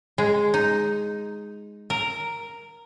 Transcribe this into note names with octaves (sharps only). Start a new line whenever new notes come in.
G#3
D#4
A#4